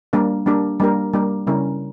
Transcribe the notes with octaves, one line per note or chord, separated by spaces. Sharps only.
G3 A#3 D4 G4 A#4
G3 A#3 D4 G4 A#4
G3 A#3 D4 G4 A#4
G3 A#3 D4 G4 A#4
C#3 G3 C#4 E4 A#4